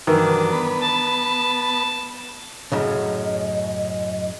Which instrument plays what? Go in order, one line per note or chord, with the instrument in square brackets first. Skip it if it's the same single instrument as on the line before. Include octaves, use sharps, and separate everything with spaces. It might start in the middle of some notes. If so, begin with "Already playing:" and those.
[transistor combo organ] G2 F#3 [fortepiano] D#3 E3 [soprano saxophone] D4
[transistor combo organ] B3 B4
[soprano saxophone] A5
[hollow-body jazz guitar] F#2 A2 C#3 [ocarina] D#5